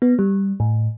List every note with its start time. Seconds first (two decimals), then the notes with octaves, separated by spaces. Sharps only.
0.02 B3
0.19 G3
0.60 A2